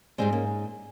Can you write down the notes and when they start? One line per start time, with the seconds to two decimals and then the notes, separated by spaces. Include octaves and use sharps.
0.18 G#2 D#3 G3 G#3 C4
0.32 A#3 C#4